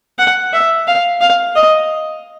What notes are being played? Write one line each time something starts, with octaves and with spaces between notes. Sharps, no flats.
F#5
E5
F5
F5
D#5